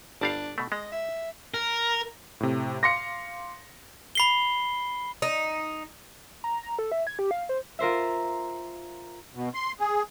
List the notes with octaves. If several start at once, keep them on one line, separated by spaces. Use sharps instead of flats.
G1 G3 D4 F5
B2 A3
G#3 D#5
E5
A#4
A2 C3
F5 C6 D6 A#6 C#7
B5 C7 G7
D#4
A#5
A#5
A4
E5
G#6
G4
F5
C5
F4 A#4 C5 E5
B2
C6
G#4